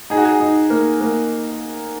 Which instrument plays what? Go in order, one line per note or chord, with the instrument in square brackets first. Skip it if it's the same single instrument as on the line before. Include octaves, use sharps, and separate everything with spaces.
[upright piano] D#4 [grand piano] G#4
[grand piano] F#4
G#4
[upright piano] D#4
A#3
A#3